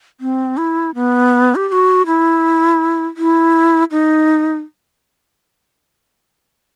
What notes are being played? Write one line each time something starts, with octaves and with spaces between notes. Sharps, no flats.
C4
E4
B3
G4
G4
F#4
E4
E4
D#4